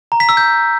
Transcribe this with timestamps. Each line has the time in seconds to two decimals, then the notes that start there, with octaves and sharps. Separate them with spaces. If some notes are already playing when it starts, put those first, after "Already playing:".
0.12 A#5
0.20 B6
0.29 E6
0.37 G6